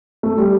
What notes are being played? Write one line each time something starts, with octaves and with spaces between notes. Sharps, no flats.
A3
G3